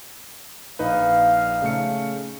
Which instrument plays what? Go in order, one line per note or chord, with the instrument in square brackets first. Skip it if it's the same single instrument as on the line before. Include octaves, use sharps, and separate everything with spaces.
[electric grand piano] A#1 D#4 B4 [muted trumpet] F5
[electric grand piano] C#3 A3 C#7